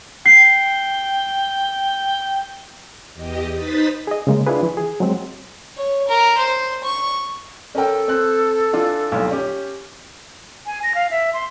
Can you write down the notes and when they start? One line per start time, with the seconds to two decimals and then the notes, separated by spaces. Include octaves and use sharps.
0.26 G5 C7
3.14 E2 G4 D#5
3.53 D#4 B4 C5 D#6 A6 B6
4.07 G#4 D#5
4.27 C#3 G#3 A#3
4.47 D4 E4 F4 G#4 B4
4.63 E3
4.77 G#4
5.00 F#3 G#3 C4
5.77 C#5
6.08 A#4
6.37 C5
6.84 C#6
7.75 C#4 A4 A#4 G5
8.08 C4 F#6
8.73 E3 D4 F4
9.12 D#1 B1
9.31 C#4 G4
10.66 G#5
10.83 A#6
10.95 F5
11.11 E5
11.34 C6